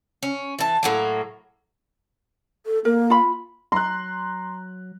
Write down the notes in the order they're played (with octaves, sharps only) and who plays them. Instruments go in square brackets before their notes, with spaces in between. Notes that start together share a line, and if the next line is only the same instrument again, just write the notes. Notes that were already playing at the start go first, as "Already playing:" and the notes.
[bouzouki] C#4
E3 A5
A2 F#3 A#3
[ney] A4
[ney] A#3 [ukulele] A#4
[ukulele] F4 B5
[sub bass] F#3 [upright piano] A#5 [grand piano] C6 F#6